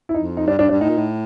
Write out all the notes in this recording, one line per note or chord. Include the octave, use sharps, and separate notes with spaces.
E4
F2 D#4
D#4
G2 D4
G2 D4
G2 D4
A2 D#4
A#2
A2